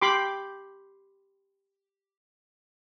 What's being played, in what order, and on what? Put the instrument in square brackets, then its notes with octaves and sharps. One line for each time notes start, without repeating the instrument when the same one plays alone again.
[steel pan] G4 B5 C6 D6